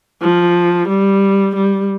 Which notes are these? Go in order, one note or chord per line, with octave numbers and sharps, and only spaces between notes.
F3
G3
G3